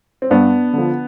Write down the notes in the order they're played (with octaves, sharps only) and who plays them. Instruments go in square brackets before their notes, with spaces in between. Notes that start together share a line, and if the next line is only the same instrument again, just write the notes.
[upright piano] C4
G2 B3 D4
D3 F3